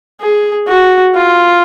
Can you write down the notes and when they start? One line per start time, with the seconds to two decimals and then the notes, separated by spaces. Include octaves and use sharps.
0.21 G#4
0.68 F#4
1.14 F4